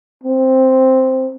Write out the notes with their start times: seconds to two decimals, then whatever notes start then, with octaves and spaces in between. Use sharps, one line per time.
0.23 C4